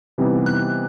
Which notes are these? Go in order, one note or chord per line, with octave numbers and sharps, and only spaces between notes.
C3 E3 G3 B3 D#4
F#6